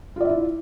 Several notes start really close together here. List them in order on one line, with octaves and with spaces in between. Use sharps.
F4 D5 E5 E4